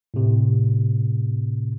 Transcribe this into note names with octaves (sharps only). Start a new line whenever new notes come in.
A2 C3